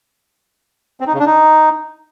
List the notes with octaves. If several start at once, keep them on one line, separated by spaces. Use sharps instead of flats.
C4
D#4
C#3
D4
D#4